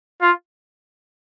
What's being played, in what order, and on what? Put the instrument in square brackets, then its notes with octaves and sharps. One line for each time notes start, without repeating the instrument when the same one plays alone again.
[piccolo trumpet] F4